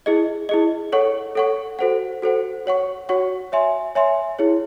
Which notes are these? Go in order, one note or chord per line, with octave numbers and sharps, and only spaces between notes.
E4 G#4 D#5
E4 G#4 D#5
A4 C#5 F#5 C#6
A4 C#5 F#5 C#6
F#4 A4 C5 F#5
F#4 A4 C5 F#5
F#4 C#5 F#5 C#6
F#4 C#5 F#5 C#6
C#5 E5 G#5 C6
C#5 E5 G#5 C6
E4 G#4 C#5